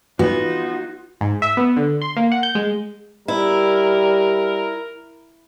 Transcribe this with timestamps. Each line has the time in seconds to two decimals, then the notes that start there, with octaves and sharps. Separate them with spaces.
0.19 B3 D#4 F4 F#4
1.21 G#2
1.42 E5
1.57 B3
1.76 D3
2.02 C6
2.16 A#3
2.32 F#5
2.43 G6
2.55 G#3
3.28 G3 E4 A#4